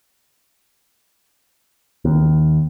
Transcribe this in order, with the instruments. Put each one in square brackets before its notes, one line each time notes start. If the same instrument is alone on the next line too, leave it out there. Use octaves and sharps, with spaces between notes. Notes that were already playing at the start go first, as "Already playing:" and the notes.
[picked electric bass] D#2